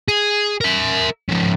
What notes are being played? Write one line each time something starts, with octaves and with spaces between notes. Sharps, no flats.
G#4
A#4 E5
C#3 F3